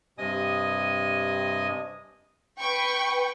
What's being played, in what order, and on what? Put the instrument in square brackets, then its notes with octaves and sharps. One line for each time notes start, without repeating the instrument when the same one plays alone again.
[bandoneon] G2 C3 D#5 G#5 D#6
[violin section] B4 G5 C#6